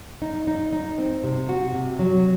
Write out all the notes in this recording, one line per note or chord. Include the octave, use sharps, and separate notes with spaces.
D#4
D#4
D#4
C4
C3
F#4
C3
F#3